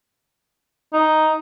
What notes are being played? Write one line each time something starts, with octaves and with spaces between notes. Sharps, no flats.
D#4